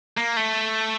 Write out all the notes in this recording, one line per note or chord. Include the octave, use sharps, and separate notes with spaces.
A#3
A3